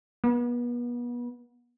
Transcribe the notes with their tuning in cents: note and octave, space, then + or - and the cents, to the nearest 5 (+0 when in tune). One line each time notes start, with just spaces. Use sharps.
B3 -35